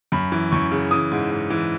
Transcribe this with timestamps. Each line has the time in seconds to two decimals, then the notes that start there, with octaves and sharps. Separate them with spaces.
0.12 F#2 B5
0.32 E3
0.52 F#2 C#6
0.72 C#3
0.91 E3 D#6
1.11 G#2
1.31 G#2
1.50 E3